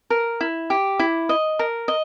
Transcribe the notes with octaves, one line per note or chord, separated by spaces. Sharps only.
A#4
E4
G4
E4
D#5
A#4
D#5